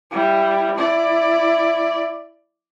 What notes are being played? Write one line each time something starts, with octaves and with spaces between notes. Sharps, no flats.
G3 E4
E4 D5